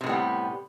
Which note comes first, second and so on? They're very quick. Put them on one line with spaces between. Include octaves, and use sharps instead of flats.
C3 A2 B3 G3